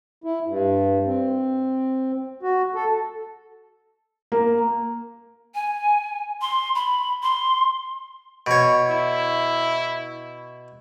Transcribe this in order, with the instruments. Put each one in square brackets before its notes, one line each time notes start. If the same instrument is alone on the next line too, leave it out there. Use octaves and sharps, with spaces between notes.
[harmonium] E4
G2
C4
F#4
A4
[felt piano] A#3
[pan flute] G#5
C6
B5
C6
[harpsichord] B2 C#5
[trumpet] E4